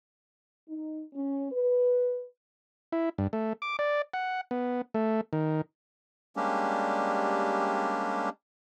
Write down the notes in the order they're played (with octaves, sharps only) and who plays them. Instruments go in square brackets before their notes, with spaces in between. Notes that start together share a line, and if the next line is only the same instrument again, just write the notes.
[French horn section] D#4
C#4
B4
[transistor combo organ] E4
G2
A3
D6
D5
F#5
B3
A3
D#3
[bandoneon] G3 G#3 A#3 C#4 D4 G4